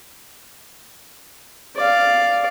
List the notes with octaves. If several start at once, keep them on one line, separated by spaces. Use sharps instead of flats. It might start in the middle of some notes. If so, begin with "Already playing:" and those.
D5 F5